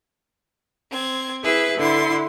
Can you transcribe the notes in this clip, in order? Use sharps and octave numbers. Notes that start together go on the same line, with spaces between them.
C4 G#6
E4 G#4 B4 E5
D3 E4 C6